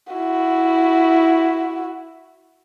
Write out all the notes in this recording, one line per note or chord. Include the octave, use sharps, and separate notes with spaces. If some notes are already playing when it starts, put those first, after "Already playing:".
E4 F#4